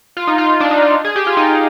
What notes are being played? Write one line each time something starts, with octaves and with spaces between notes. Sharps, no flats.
F4
D#4
F4
D4
D#4
F4
G#4
G4
F4
D#4